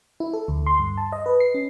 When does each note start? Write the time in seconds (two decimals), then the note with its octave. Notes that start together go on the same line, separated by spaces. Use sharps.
0.20 E4
0.33 A4
0.48 D2
0.67 C6
0.79 G2
0.97 A5
1.12 D#5
1.26 B4
1.40 C7
1.54 C#4